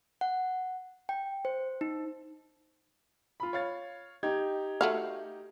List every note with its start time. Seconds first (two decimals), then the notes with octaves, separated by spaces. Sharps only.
0.21 F#5
1.09 G5
1.45 C5
1.81 D#4
3.40 F4 B5
3.53 C#5 F5 A6
4.23 D#4 G4 G#6
4.81 A3 F#4 F5